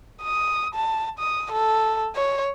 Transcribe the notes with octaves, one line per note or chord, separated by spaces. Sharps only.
D#6
A5
D#6
A4
C#5